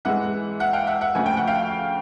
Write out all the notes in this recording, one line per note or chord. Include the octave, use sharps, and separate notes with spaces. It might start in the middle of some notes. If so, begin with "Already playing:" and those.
G#2 E3 G#3 E5 F#5
E5 F#5
F5 G5
E5 F#5
E5 F#5
D2 C#3 F3 G#5
G5
F#5
F5 G5